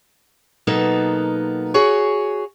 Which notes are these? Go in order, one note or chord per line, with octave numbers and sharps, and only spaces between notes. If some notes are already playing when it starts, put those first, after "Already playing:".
B2 F#3 A#3 B3 D#4 A4
F#4 G#4 C#5